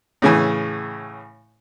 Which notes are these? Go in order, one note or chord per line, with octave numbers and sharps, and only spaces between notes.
A2 C#3 E3